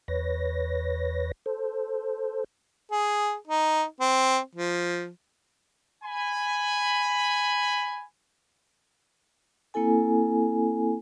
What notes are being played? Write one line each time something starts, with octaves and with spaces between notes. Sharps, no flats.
E2 B4 C#5 A#6
A4 C5
G#4
D#4
C4
F3
G#5 B5
A#3 C4 E4 A4 G#5